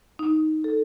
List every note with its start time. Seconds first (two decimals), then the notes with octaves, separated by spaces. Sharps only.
0.19 D#4
0.64 A4